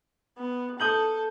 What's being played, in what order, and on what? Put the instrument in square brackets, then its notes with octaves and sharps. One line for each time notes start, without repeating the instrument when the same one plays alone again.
[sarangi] B3
[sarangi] A4 [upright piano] D#6 G6 F#7